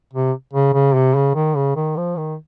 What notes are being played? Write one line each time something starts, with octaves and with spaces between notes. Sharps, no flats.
C3
C#3
C#3
C3
C#3
D#3
C#3
D#3
F3
D#3